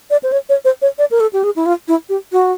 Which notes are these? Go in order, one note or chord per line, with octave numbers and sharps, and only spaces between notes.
D5
C5
C#5
C#5
C5
C#5
D5
A#4
A4
G4
G#4
E4
F4
E4
G4
F#4